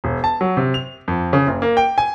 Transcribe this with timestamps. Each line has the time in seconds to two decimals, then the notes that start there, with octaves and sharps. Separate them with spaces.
0.04 E1
0.24 A5
0.41 F#3
0.57 C3
0.74 F7
1.08 F2
1.33 C#3
1.47 F#1
1.62 A#3
1.77 G5
1.98 G#5